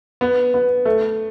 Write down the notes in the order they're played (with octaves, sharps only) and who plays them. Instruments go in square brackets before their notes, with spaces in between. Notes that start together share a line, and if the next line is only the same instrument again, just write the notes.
[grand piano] B3
B3
A3